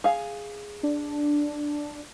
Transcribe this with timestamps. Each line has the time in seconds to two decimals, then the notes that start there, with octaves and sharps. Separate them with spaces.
0.04 G#4 F5
0.83 D4